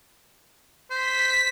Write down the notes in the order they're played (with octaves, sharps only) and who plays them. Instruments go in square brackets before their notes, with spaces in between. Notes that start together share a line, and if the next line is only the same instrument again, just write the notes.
[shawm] C5 [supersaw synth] B6